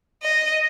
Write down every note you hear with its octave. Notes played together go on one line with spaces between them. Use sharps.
D#5